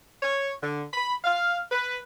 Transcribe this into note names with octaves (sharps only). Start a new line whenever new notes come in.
C#5
D3
B5
F5
B4